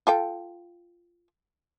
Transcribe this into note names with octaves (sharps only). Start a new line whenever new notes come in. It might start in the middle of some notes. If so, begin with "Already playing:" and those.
F4 A4 G5